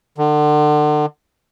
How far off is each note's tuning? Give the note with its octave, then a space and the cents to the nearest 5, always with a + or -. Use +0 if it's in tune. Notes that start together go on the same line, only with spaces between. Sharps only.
D3 +35